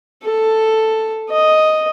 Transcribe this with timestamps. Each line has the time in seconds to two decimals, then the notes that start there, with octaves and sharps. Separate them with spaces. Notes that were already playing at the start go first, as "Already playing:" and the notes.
0.24 A4
1.30 D#5